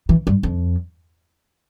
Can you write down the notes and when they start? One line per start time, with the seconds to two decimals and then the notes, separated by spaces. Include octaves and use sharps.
0.09 E3
0.27 G2
0.43 F2